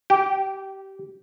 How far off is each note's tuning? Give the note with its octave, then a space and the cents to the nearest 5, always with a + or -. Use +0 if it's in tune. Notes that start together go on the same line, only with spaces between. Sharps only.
G4 -20 G5 +0